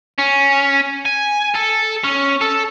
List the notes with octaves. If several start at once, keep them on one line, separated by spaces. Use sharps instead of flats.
C#4
G#5
A4
C#4
A4